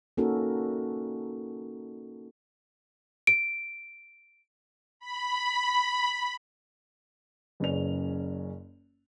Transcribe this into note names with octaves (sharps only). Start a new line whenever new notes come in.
A#3 C#4 D#4 F#4 A4 A#4
D7
B5
F#1 C#3 C#4 B4 D5 F7